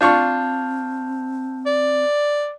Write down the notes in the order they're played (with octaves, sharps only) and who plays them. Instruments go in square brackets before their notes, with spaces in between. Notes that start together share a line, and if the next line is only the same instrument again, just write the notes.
[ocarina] C4 [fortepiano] D4 F4 C#6 [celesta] A5 G6
[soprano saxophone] D5